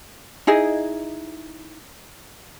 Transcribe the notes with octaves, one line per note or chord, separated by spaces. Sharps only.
D#4 E4 G#4 D#5